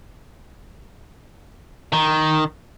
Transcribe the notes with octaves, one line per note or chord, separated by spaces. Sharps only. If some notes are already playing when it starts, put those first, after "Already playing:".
D#3